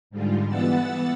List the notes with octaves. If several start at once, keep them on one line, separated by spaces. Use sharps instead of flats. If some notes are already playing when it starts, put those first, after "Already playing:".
G#2 D3 G3 G#3 F4
E3 B3 F#5 E6 A6